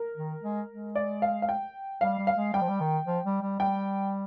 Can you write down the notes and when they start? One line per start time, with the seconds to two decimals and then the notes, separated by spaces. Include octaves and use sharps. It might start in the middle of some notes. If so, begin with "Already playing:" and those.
Already playing: A#4
0.17 D#3
0.43 G#3
0.70 G#3
0.95 D5
1.22 F5
1.42 F5
1.49 G5
2.01 G3 F5
2.18 G3
2.27 F5
2.36 G#3
2.53 G3 G5
2.61 F3
2.69 G3
2.80 D#3
3.06 F3
3.25 G3
3.42 G3
3.59 G3 G5